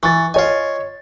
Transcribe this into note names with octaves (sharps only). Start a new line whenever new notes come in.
E3 C#6 A6
F4 C#5 D#5 G#5